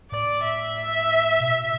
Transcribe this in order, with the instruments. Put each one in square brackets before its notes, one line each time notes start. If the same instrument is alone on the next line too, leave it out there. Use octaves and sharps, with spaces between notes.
[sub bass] A2 [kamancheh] D5
[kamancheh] E5
[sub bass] B2